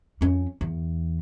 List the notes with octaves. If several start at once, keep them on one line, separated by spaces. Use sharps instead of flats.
F2 C#4
E2